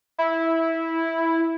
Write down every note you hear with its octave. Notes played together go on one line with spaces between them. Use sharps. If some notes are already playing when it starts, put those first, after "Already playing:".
E4